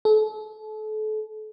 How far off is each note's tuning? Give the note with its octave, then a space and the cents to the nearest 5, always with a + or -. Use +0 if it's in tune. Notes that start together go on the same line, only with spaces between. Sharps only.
A4 -35